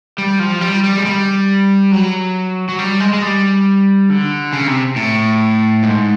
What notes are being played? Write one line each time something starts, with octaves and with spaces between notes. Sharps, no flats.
G3
F3
G3
G3
G#3
G3
F#3
F#3
G3
G#3
G#3
G3
D3
C#3
C3
A2
G#2